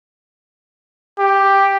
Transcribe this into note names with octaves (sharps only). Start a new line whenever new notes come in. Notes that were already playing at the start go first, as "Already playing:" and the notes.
G4